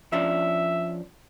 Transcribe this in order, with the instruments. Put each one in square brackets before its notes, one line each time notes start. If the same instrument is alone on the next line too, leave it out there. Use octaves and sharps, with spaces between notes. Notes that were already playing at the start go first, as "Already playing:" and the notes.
[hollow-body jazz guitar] F3 C#4 D4 [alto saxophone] E5